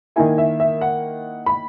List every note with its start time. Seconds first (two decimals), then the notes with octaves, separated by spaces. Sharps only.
0.16 D#3 A#3 E4 G#5
0.38 E5
0.60 E5
0.81 F#5
1.46 B5